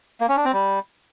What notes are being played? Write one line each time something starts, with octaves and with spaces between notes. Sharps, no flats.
A#3
C#4
D4
C4
G3